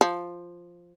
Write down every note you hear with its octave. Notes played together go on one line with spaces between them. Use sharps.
F3